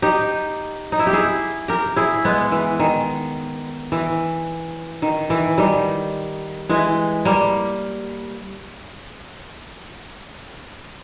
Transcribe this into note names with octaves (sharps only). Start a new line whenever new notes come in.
D#4 G4
D#4
E4
G4
E4 G#4
G4 A#4
E4 G#4
G#3 B3
E3
D#3
E3
D#3
E3
D#3 G3
E3 G#3
G3 A#3